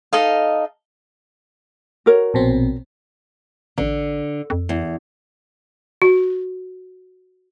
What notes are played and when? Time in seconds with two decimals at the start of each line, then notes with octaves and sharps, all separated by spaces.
0.13 D#4 A4 D#5 F5
2.06 F#4 A#4 C#5
2.34 A#1 B2 C4
3.78 A1 D3
4.50 F2
4.69 E2
6.02 F#4